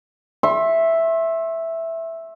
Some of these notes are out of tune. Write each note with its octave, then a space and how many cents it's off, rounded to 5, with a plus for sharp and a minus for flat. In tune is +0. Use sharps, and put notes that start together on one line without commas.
E5 +0 C6 +40